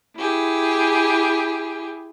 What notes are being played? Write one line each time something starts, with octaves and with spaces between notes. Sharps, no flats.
E4 G4 G#4